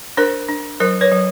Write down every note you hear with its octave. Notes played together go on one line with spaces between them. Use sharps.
D4 A#4 C5
D4
F#3 A#4 C5
B4 C#5
F#3